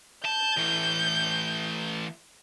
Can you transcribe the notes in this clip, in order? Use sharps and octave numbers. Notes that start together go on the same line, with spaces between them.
A5 G6
E3 A3